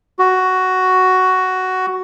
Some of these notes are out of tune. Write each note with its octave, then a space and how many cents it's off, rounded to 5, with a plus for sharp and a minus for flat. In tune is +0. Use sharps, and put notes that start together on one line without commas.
F#4 +5